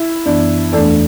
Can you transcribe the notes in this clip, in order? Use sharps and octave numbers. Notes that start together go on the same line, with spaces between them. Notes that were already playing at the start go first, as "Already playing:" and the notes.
Already playing: E4
F#2 E3 B3 D4
E2 E3 A3 D4 A4 D5